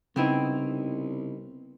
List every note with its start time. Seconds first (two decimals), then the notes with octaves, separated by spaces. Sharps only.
0.16 C2 C#3 B3 C4 D#4 E4